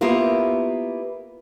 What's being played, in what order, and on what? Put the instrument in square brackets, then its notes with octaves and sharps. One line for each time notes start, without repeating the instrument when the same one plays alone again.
[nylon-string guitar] A#3 B3 E4 F4 G4 A#4